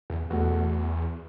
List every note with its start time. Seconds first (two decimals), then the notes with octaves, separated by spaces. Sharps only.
0.10 E2
0.30 E2 B2 A3 F#4